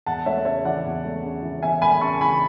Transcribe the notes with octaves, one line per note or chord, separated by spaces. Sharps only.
E2 F#5 A5
A3 C#5 E5
C#3 C#5 E5
E3 D5 F#5
E2
A3
C#3
E3
E2 E5 G#5
A3 G#5 B5
C#3 A5 C#6
E3 G#5 B5